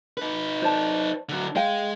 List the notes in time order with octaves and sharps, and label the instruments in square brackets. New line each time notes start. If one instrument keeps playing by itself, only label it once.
[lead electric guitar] D#4 B4
[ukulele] C5 D5 A5
[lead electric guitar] D3 F#3
[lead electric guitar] G#3 [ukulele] F5 G5